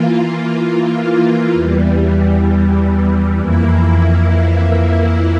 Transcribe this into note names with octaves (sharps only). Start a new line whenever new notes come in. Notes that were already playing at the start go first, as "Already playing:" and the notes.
Already playing: E3 A#3 F4
E2 E3 G3
F2 E3 A#3 E4